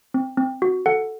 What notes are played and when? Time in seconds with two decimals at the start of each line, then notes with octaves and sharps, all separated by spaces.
0.14 C4
0.38 C4
0.62 F#4
0.86 A4 F#5